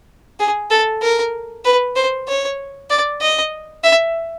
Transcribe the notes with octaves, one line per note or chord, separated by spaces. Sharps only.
G#4
A4
A#4
B4
C5
C#5
D5
D#5
E5